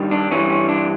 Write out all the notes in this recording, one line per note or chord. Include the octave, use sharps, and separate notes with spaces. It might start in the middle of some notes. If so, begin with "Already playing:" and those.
Already playing: G2 D#3 G3
D4
G2 E3 G3 C#4
C#4
D4